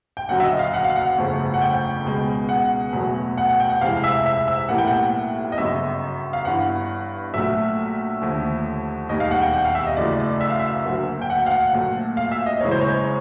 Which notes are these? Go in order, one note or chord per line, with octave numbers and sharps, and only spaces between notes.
G5
F#1 F#2 D3 F#3 F#5
E5
D#5
F5
F#5
F5
F#5
G1 F2 C#3 F3 A3
F#5
G5
C#2 B2 G#3
F#5
E2 B2 F#3 A3
F#5
F#5
G5
F#5
F2 C3 E3 G#3 F5
E5
E5
E5
B1 A2 E3 G3 A#3 F#5
G5
F#5
D#5
G1 F#2 C#3 F#3 E5
F5
G1 G2 E3 F#5
A#1 A#2 F#3 A3 E5
D#2 D3 F3 A3
E1 D#2 D#3 G3 D#5
F5
F#5
G5
F#5
F5
E5
D#5
F#2 C#3 E3 A3 D5
D5
E5
F5
E5
D2 D3 F#3 A#3
G5
F#5
F5
F#5
A#1 A#2 F#3 A3
F5
E5
D#5
F#1 F#2 C#3 E3 G#3 C#5
C5
C#5